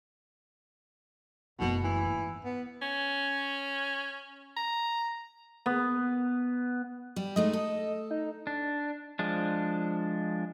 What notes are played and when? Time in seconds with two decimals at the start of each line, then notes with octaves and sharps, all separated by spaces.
1.60 F#1 B2 A3
1.84 E3
2.05 G#2
2.44 B3
2.82 C#4
4.57 A#5
5.66 B3
7.16 G3
7.36 G#3 A3 D#4 D#5
7.53 A4
8.11 D#4
8.47 D4
9.19 F3 G#3 D4